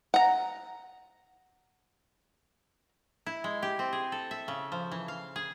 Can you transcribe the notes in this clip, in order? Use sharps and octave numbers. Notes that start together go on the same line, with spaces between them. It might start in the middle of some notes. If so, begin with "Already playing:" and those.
F#5 A#5
E4
G#3
G4
C4
G#4
A4
E5
C#3
F3
E3
F5
G#4